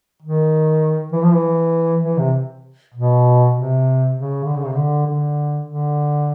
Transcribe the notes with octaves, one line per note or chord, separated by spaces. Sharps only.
D#3
E3
F3
E3
E3
C3
B2
C3
C#3
D3
C#3
C3
D3
D3
D3